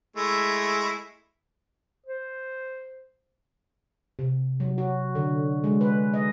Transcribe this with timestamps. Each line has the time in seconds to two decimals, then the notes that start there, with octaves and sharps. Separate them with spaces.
0.16 G#3 A3 E4
2.06 C5
4.19 C3
4.60 F#3
4.78 F#4
5.15 D3
5.64 G#3
5.81 B4
6.14 D#5